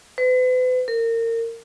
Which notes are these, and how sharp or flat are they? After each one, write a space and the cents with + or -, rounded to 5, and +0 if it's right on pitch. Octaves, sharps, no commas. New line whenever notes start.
B4 +40
A#4 -30